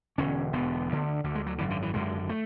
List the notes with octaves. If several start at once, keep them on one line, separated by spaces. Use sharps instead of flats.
E1 E2 D3 C#4
E1 E2 D3 B3
D2 D3
D2 D3
G#3
F#3
G#1 F#2 D3 E3
D3
E3
G#1 F#2 D3 G#3
A3